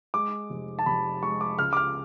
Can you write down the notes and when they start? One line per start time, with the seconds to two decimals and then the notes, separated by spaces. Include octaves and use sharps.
0.14 G#3 D6
0.50 F1
0.79 A5
0.86 F1 B5
1.22 G#3 C#6
1.41 D6
1.59 C#2 F6
1.73 D6
1.77 F6